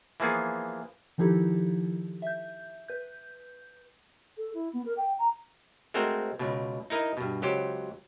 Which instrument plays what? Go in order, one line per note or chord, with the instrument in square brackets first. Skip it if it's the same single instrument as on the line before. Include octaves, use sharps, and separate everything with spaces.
[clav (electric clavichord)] E3 F3 A#3 B3 G#4
[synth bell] D#3 F3 D#4 E4 G4 A4
E5 G6
B4 G6
[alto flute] A4
E4
B3
A#4
G5
A#5
[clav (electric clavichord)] G#3 A3 C4 F#4 A#4 C5
C#2 B2
D#4 E4 A#4 D#5
G2 B2
C#2 F#3 G4 C5